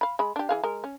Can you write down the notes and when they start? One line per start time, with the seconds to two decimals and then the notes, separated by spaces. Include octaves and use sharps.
0.01 F5 B5
0.19 G#3 B5
0.36 D4 G4
0.49 E3 G#4 F5
0.63 G#3 A#4
0.84 C#4